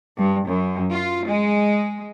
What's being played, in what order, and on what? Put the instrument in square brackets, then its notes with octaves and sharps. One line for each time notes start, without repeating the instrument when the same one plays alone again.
[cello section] G2
F#2
F4
G#3